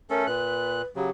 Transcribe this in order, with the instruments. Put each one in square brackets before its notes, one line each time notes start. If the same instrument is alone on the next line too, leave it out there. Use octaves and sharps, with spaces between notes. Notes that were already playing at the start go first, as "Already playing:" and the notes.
[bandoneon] A3 C#4 A4 [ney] A#4
[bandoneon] A#2 F#6 [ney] B4
[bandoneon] C#3 F#3 [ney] G4